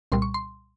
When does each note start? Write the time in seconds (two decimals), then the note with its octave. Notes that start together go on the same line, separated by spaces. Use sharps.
0.12 C2 A#2 G3 C6
0.22 C#6
0.34 C6